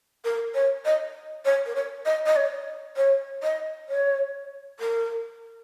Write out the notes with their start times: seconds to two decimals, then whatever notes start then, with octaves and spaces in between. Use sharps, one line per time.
0.25 A#4
0.54 C#5
0.85 D#5
1.45 C#5
1.66 A#4
1.76 C#5
2.06 D#5
2.26 D#5
2.36 C#5
2.97 C#5
3.43 D#5
3.88 C#5
4.80 A#4